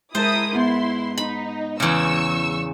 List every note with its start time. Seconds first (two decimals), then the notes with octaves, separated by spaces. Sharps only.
0.15 G#3 E4 A#4 C5 A5 A#5 D#6
0.54 G#2 B3 E4 C6
1.17 D#4 B5
1.80 E2 C#3 C#6 E6